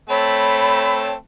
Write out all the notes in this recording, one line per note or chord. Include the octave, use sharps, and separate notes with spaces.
A3 C4 C#5 A5 B5